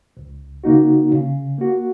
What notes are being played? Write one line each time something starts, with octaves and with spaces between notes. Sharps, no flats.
C#2
C#3 A#3 D#4 F#4
C#3
A#3 F#4